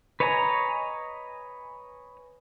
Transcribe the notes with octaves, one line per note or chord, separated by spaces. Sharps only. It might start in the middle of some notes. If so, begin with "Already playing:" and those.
B4 C#5 D#5 G#5 A#5